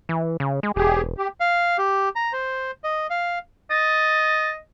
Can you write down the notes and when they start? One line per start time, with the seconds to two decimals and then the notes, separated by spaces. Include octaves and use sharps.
0.09 E3
0.40 C#3
0.63 G#3
0.76 E1 G4 G#4
1.18 G4
1.40 F5
1.78 G4
2.16 A#5
2.33 C5
2.84 D#5
3.10 F5
3.70 D#5 A6